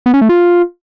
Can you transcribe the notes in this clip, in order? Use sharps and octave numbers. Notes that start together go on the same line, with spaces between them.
B3
C#4
A3
F4